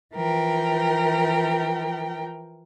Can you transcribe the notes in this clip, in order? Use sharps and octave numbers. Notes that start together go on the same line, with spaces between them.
E3 F3 A#4 G5